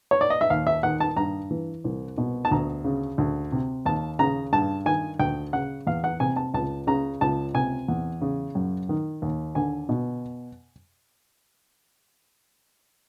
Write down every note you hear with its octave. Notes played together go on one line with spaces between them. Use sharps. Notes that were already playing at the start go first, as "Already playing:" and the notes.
C#5
D5
D#5
E5
D#2 F5
E5
D#3 F#5
A5
G2 A#5
E3
C2
B2
A5
D2 A#5
C#3
D2
C3
D#2 A5
C#3 A#5
G2 A5
D#3 G#5
D2 G5
C#3 F#5
E2 F5
F#5
C3 G#5
A5
C#2 A5
C#3 A#5
C#2 A5
C3 G#5
E2
C#3
F#2
D#3
D#2
D3 G#5
B2